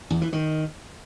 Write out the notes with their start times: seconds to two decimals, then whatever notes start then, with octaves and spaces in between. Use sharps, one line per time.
0.10 E2
0.21 E3
0.33 D#3